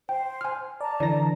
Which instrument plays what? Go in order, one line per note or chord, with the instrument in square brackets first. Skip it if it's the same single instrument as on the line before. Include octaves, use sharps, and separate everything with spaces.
[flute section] C5 [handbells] G5
[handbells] G#5 F6
[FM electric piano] D5 [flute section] A5 A#5
[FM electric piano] D3 E3 A#6 [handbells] D5